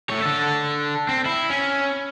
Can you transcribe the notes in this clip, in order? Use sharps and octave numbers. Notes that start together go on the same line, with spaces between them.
A3 C#5
D3 A4
C4
E4
C#4